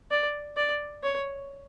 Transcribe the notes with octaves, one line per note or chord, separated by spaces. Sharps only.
D5
D5
C#5